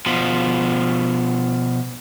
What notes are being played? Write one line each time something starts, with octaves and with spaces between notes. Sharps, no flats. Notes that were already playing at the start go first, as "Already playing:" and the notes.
B2 F3